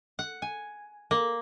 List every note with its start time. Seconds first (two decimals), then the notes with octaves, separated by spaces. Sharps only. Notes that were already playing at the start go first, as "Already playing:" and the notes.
0.19 F#5
0.42 G#5
1.11 A#3